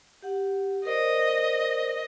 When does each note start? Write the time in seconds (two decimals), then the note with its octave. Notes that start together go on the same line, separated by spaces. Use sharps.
0.22 G4 F#5
0.85 A#4 C5 D5 D#5